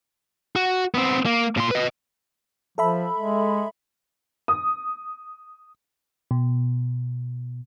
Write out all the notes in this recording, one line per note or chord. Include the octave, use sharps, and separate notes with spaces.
F#4
B3 C4
A#3
A#2 C6
B4 D#5
F3 A4 E5 B5
G#3
D#6
B2